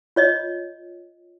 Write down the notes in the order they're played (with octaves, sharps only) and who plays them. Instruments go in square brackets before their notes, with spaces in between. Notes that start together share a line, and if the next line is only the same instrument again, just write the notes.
[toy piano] F4 C#5 D#5